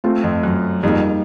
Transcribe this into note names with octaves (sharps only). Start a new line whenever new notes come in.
A3 C4 F4
F2
F#2
F2 G3 A#3 D#4 G#4